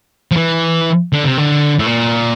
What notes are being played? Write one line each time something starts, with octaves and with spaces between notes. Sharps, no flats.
F3
E3
D3
C3
D3
A2
A#2